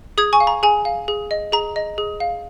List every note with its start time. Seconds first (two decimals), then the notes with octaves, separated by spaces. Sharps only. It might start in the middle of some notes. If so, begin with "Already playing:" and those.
0.18 G#4 D#6 G#6
0.33 G#5 C#6
0.40 F5
0.47 A#5
0.63 G#4 G#5
0.85 F5
1.08 G#4
1.31 D#5
1.52 G#4 A#5
1.76 D#5
1.98 G#4
2.20 F5